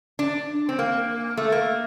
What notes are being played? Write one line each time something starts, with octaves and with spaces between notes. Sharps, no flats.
D4
C4
A#3
A3
A#3